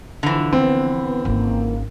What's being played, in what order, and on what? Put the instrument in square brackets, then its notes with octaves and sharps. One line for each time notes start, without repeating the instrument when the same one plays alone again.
[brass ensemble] B1 F3 [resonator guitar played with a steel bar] D3 E3
[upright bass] F3 [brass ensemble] B3 [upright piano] C4
[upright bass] G#1 C#4 [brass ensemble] A#3